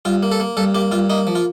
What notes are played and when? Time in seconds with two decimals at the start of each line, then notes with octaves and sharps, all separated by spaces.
0.05 G2 F4
0.23 A#3
0.32 A4
0.40 A#3
0.57 G2 A4
0.75 A#3 G4
0.91 G2 F4
1.10 A#3 D#4
1.27 F3
1.35 F4